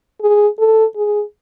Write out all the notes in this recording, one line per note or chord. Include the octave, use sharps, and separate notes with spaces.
G#4
A4
G#4